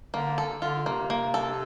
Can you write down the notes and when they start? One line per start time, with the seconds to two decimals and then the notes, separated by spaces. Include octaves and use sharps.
0.14 D3 A#3
0.38 A4
0.61 D3 F4
0.86 C3 A#3
1.10 A#3
1.34 A4